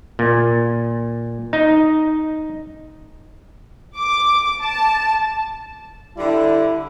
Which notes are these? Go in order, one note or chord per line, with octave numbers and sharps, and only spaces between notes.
A#2
D#4
D6
A5
D3 G3 E4